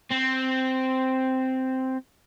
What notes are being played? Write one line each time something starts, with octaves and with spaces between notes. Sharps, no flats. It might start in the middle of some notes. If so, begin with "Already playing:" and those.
C4